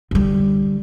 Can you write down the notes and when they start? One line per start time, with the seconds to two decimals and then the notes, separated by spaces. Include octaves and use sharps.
0.11 D3 G3